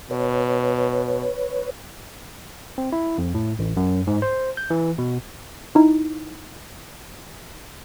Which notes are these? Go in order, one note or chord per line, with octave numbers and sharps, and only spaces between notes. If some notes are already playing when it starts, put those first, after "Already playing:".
B2 B4 C#5
C4
E4
F2
A2
A1
F#2
G#2
C5
G6
E3
B2
D#4 E4